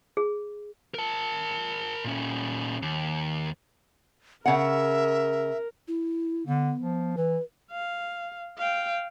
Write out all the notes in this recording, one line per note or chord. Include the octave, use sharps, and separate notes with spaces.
G#4
A#4 A5
A#2 C#4
D#2
C#3 A#4 E5 F#5
E4
D3 B3
F3
E3 B4
F5
F5 G5